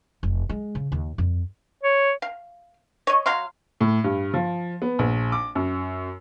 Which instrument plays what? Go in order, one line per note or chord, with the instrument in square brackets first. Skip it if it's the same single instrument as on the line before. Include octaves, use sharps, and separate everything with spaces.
[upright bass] F1
G#3
C#3
D#2
F2
[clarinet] C#5
[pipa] F5
C#5 D#5
F#3 F5 C6
[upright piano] A2
G2
F3
B3
A#1
D6
F#2